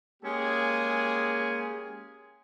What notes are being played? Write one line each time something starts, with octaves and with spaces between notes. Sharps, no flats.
G#3 A#3 C#4 G4 G#4